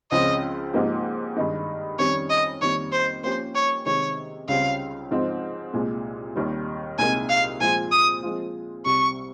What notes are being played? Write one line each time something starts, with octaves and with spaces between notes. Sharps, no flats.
C#2 C#3 F3 G#3 C4 D#5
G#2 F3 A#3 D#4 G4
G2 D#3 G#3 D#4
F2 D#3 G3 C#4 C#5
D#5
F2 D#3 G3 A#3 C#5
C5
F3 A#3 C#4 G4 A#4 C5
C#5
C3 D#3 G#3 C#5
C#2 C#3 G3 C4 F5
G#2 F3 C4 D#4
C2 A#2 G#3
D#2 D#3 G3
C2 A#2 G#3 D#4 A#4 G#5
F5
A#2 F3 G#3 C4 F4 G#5
D#6
F3 G#3 C4 F4
C2 C3 G3 C#6